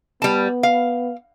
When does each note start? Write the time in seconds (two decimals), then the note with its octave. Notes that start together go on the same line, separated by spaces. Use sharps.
0.22 G3 B3 A5
0.63 F5